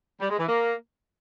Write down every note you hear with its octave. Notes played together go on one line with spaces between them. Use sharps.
G3
G#3
E3
A#3